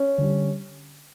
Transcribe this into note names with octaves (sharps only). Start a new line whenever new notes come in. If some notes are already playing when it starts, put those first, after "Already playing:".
Already playing: C#4
D3 G3